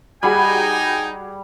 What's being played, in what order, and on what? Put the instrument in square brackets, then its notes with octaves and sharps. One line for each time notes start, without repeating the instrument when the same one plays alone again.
[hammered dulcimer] G3 [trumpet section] D#4 G5 [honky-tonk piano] F#4 G#4 B5 [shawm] G#5